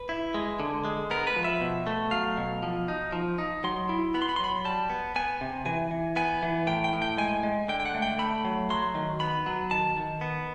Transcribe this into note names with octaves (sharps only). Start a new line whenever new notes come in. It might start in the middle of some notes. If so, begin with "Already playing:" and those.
Already playing: B4
E4
G#3
D3
G#3
B3 A#4
B4
F3
E5
B2
A3
F#3 F5
B2
F3
D#4
F3
D#4
F#3 C6
E4
B3 B5
C6
B5
C6
F#3 B5
G3 A5
B3
B3 G#5
C3
E3 G#5
E3
B3 G#5
E3
A2 G5
G5
A2
G5
G#3 G#5
G#3
D3 G5
G5
F#5
A3
G5
A3 B5
F#3
F#3 C6
D#3
B3 B5
F#3
D#3 A5
D#3
B3